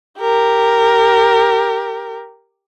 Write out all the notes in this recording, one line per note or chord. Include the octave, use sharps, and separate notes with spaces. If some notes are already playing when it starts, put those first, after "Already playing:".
G4 A#4